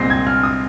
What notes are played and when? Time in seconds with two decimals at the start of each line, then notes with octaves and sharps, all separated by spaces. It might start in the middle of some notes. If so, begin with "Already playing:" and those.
Already playing: C2 A#2 G#3 C4 A#6 C7
0.10 G#6
0.27 F6
0.43 D#6